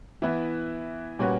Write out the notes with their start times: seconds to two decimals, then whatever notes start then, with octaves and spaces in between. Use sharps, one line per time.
0.22 E3 B3 E4 B4
1.19 A#2 G3 C#4 F#4 B4